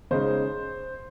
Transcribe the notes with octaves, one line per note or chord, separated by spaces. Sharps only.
C#3 G#3 D#4 C5